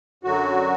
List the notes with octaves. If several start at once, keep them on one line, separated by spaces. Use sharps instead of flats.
F#2 D3 F#3 F#4